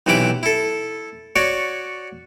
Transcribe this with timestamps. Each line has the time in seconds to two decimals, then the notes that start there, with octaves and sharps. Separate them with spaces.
0.06 B1 C3 E3 E4 B5 D6
0.43 E4 A4
1.36 F#4 C#5 D5